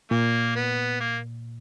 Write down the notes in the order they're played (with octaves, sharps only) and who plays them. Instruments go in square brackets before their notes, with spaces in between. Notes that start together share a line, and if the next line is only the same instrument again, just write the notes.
[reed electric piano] A#2 [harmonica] A#3
[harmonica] B3
A#3